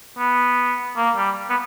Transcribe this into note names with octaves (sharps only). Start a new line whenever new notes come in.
B3
A#3
G3
B3